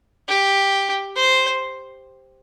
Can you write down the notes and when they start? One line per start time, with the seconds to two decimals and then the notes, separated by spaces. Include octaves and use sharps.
0.28 G4
1.16 C5